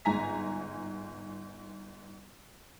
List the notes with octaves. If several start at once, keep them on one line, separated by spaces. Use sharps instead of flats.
G1 G#2 G#5 A#5 B6